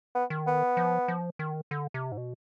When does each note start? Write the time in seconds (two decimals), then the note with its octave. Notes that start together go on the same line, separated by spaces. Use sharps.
0.15 B3
0.30 D#3
0.47 B3
0.77 F3
1.08 F3
1.39 D#3
1.71 D3
1.94 C3
2.12 G#2
2.17 B2